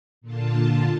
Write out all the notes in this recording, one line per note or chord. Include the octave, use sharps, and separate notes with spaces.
A#2 D3 F4 A5